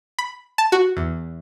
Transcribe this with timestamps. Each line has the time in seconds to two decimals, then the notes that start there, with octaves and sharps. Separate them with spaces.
0.19 B5
0.58 A5
0.72 F#4
0.97 E2